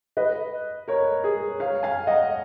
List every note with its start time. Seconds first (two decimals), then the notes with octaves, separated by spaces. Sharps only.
0.17 B4 D#5
0.88 A#4 C#5
1.24 G#4
1.60 C#5 F5
1.83 F5 G#5
2.07 D#5 F#5